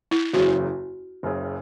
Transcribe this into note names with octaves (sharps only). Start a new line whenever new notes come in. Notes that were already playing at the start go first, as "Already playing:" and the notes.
E4
F#1 E2 C#3 F#3 F#4
F#1 F#2 C#3